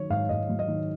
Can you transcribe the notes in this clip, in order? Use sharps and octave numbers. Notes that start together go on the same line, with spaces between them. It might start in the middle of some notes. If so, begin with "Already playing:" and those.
Already playing: D#3 F#3 C#5
G#2 F5
G#2 D#5
F#3
D#5
D#3